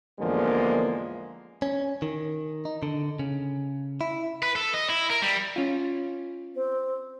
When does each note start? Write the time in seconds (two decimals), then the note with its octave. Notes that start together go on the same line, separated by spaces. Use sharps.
0.20 A1 E2 D3 F3 G#3 A#3
1.62 C#4
2.02 D#3
2.65 D#4
2.83 D3
3.19 C#3
4.01 E4
4.43 B4
4.55 A4
4.74 D#5
4.89 E4
5.10 A#4
5.22 G3
5.56 C#4 F4
6.54 C4